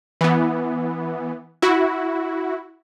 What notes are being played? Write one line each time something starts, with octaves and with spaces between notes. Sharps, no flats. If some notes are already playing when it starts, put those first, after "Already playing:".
E3 B3
E4 F#4